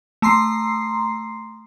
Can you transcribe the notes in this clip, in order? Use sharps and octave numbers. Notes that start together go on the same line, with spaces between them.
A3 A#5 C6 C7